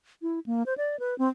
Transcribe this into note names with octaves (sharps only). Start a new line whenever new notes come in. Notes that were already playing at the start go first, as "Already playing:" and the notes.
E4
A#3
C5
D5
B4
C4